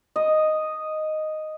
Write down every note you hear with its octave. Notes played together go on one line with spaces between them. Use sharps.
D#5